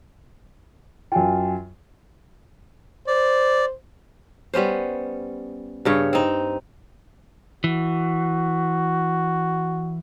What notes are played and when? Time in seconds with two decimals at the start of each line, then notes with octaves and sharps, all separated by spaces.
1.12 F#2 F4 G5 G#5
3.07 C5 D5
4.54 G3 B3 C#4 C5
5.85 G2 C#3 C#5
6.13 C4 D#4
7.64 E3 F#4